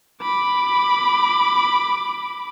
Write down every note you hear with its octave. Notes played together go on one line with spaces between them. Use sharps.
B5 D6